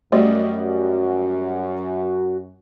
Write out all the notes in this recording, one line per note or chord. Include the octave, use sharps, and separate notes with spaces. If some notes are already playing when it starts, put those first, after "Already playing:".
F#2 G3 A3 F#4 D5 D#5